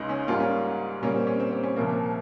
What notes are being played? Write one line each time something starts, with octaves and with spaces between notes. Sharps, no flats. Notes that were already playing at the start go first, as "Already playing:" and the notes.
Already playing: C#2 C#3 G#3 D#4
C#4
G#2 G3 A#3 F4
C#4
A#2 G3 A#3 C#4
C4
C#4
C4
C4
C#4
C2 A#2 F3 A#3